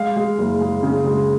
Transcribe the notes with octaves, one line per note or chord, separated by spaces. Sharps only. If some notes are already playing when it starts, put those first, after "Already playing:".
Already playing: G#3 F5
G#3
F#1
G#3
C#3
G#3